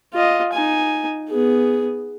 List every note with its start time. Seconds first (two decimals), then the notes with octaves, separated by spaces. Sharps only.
0.14 F4 D#5
0.53 D#4 G#5
1.29 B3 G#4